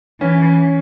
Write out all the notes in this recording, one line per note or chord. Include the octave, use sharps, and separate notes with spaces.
E3 C#4